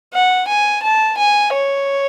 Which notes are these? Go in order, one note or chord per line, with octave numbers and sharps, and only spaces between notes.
F#5
G#5
A5
G#5
C#5